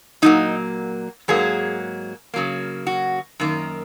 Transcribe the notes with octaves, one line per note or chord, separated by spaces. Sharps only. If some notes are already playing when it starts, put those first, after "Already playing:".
A#2 F#3 A#3 D#4
G#2 F#3 A#3 G#4
C#3 F#3 A#3
F#4
F#2 D#3 A#3